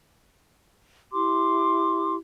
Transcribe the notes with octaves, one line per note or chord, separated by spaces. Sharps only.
E4 G4 C6 D6